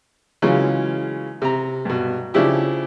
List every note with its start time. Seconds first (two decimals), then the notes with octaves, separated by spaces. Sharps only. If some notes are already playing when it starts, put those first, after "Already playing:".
0.42 C#3 E3 F#3 G#3 C#4 F4
1.42 C3 A#5
1.85 G2 B2
2.34 C#3 F3 D4 E4 G4